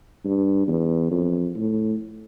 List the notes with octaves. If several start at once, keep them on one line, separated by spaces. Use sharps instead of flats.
G2
E2
F2
A2